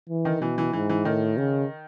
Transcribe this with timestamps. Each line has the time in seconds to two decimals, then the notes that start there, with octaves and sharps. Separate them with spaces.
0.09 E3
0.25 D#3
0.41 B2 E3
0.58 E3
0.73 G#2 E3
0.89 E3
1.05 A2 D#3
1.37 C#3